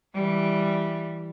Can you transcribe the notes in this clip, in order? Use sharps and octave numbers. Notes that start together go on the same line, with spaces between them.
E3 G3